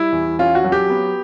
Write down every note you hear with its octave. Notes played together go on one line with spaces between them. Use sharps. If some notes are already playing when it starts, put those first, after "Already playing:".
Already playing: G3 E4
E2
C#4 F4
F#4
F#3
G4
B3